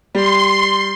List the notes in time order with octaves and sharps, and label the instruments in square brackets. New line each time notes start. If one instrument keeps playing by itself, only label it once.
[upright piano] G3 [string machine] C6